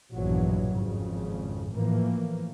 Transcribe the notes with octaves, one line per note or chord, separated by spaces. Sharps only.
A#1 E2 G2 B2 E3 F#3
G#1 F2 C#3
A2 E3 F3 A#3